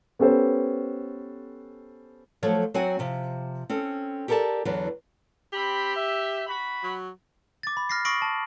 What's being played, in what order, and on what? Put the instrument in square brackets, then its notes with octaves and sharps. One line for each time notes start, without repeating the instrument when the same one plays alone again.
[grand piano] B3 C#4 G4 A4 B4 C5
[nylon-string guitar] F3 F#3 A3 A4 C#5
F#3 C4 F#4 F#5 G#5
C3 F3
C4 C#4 A4
G4 A4 A#4 C#5 D5 A5
E2 D3 E3 F#3 B4
[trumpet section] C4 B5 [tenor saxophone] G4
[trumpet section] E5
F#4 B5
[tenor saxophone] F#3
[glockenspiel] D6 A6
B5
F6 A#6 C7
C#6 D#6 A#6 C7 D7 F#7
A5